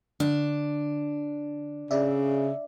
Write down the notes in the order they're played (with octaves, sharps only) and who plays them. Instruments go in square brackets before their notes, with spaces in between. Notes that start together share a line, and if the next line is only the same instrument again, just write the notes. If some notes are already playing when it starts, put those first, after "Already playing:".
[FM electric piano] D3 [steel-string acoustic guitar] D4
[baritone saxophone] C#3 [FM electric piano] D5 E5